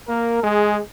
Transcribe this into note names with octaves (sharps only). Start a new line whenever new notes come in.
A#3 A#4
G#3 G#4